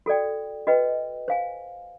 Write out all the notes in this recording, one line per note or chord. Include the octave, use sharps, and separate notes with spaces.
F#4 A4 D5 G5
F#4 B4 D#5 G5
C5 F5 G#5